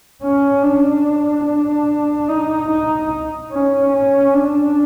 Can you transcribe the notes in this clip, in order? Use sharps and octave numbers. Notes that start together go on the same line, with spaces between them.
C#4
D4
D4
D#4
D#4
C#4
C#4
D4